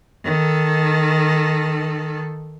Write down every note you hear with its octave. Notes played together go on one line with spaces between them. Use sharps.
D#3 A4